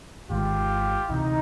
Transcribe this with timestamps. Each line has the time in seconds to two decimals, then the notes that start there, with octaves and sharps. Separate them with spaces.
0.29 G#1 G#2 D#3 G#3 F4 G4
1.09 D2 C3 E3 D#4